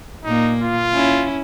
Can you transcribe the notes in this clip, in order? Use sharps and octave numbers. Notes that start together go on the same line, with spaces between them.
A#2 A#3 D#4
F4
C#4 E4